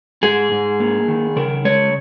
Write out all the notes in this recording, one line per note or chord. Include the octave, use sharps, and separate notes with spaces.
G#2 G#4
G#2
A#3
D#3
C#3 A#4
G#3 C#5